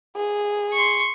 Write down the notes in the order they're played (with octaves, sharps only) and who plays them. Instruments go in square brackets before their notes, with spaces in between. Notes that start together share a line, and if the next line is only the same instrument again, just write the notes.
[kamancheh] G#4
[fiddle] C6 C#6